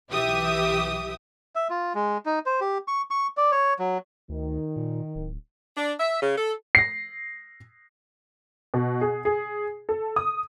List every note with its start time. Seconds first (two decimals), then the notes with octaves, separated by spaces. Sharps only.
0.10 B1 E3 G4 E5 D#6
1.55 E5
1.70 F4
1.95 G#3
2.26 D#4
2.46 C5
2.61 G4
2.88 C#6
3.10 C#6
3.37 D5
3.52 C#5
3.79 F#3
4.29 D2 D#3
4.76 A#2
5.15 D1
5.76 D4
6.00 E5
6.22 C#3
6.37 A4
6.75 A#6 C7
8.74 B2
9.01 G#4
9.25 G#4
9.89 A4
10.16 D#6